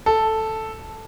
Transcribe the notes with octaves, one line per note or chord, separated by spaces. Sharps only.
A4